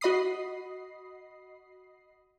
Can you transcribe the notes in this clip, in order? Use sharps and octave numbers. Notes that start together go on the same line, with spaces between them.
F#4 D#5 B5 D#6 C7